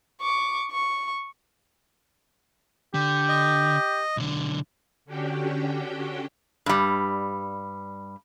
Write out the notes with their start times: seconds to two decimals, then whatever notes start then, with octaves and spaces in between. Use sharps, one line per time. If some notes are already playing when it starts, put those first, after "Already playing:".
0.21 C#6 D6
0.71 C#6
2.94 D3 G4
3.29 D#5
4.17 B1 D3
5.05 D3 C#4 D4 F#4 G4 G5
6.66 G2 G3